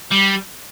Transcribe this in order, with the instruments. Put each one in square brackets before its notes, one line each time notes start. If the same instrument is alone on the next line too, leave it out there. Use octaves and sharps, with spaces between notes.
[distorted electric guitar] G3